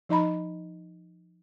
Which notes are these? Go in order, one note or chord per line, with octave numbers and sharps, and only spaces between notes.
F3 D#4 D#5 A#5 B5